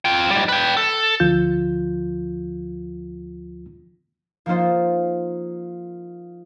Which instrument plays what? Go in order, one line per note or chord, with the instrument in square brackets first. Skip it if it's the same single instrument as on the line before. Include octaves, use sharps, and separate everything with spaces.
[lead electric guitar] F4 G5
G#2 G3
B4 G5
A4
[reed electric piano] D2 F3 F4 G6
[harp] F3 A#3 D#4 F4 C5